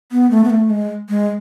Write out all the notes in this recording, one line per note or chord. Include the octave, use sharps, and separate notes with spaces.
B3
A3
B3
A3
G#3
G#3